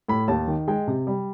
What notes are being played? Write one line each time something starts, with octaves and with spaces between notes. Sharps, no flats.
A2 B5
D#2 A5
D#3
G#3 G5
C3
G3